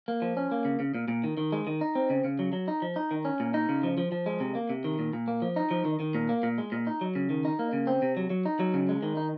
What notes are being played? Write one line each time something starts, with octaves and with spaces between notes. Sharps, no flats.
A#3
F3
C#4
A#3
C#3
C#3
A#2
A#2
D#3
D#3
G#3
D#3
D#4
C4
C#3
C#3
F#3
F#3
D#4
F3
D#4
D#3
C#4
A#2
D#4
C#3
F3
F3
F3
G#3
C3
A#3
C3
D#3
A#2
A#2
A#3
F3
D#4
F3
D#3
D#3
A#2
A#3
A#2
G#3
A#2
D#4
F#3
C#3
D#3
D#4
A#3
C#3
C4
C3
F#3
F#3
D#4
F#3
C#3
G#3
D#3
D#4